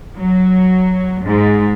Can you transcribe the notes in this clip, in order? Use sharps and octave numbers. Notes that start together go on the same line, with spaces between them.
F#3
G#2